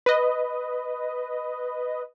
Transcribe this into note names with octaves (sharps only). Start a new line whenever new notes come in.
B4 D#5